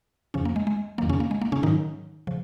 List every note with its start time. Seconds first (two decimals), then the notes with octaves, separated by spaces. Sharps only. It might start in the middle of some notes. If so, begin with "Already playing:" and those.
0.34 F2 C#3 F3 C#4
0.45 A#3
0.56 G#3
0.67 G#3
0.98 F2 D#3 F#3 A#3
1.10 C#3 C#4
1.20 A#3
1.31 G#3
1.42 A#3
1.52 C#3 C#4
1.63 G#2 D#3 F#3 D#4
2.27 C#3 F3